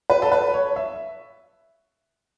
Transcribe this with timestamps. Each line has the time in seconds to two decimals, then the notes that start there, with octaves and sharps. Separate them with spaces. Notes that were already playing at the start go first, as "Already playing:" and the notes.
0.10 B4
0.22 A4
0.32 B4
0.54 C#5
0.76 E5